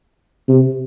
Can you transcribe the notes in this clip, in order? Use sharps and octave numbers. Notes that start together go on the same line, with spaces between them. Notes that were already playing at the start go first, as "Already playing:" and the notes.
C3